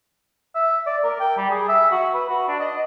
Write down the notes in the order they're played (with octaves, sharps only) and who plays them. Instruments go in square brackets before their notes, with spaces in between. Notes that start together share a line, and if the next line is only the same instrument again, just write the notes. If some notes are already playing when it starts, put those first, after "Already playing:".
[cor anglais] E5
D5
A#4
G5
G3
G#4
E5
F#4
B4
F#4
D4
D#5